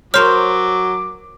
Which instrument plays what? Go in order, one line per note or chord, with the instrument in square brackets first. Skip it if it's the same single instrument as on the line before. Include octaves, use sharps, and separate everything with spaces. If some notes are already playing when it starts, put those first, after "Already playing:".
[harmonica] F#3 [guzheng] A#4 C5 A#5 [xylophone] C#5 F6 [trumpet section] D6